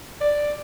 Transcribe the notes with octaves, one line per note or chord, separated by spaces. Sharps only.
D5